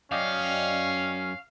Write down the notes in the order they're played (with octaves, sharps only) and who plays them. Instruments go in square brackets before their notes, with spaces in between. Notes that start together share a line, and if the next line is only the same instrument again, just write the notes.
[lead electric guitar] F#2 [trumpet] C#4 [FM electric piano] D5 D#5 G5 [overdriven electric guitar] F5